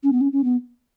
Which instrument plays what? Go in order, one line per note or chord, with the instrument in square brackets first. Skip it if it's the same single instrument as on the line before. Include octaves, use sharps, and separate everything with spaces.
[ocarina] C#4
B3
C#4
C#4
B3